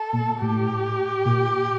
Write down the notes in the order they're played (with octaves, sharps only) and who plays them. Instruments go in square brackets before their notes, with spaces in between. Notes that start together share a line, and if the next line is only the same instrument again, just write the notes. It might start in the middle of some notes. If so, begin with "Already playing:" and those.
Already playing: [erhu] A4
[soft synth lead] A#2
[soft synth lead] A2 [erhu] G4
[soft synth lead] A#2